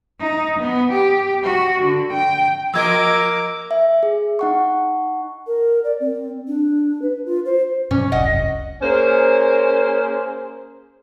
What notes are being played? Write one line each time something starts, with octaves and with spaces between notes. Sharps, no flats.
D#4
B3
G4
F#4
D3
G5
F3 A#3 A#4 D#5 D6 E6 G#6
E5
G#4
D#4 F#5 C#6
A#4
D5
C4
D4
B4
F4
C5
G2 B2 F#3 C#4
F1 C2 D#5 F#5
A#3 C#4 G#4 A#4 C5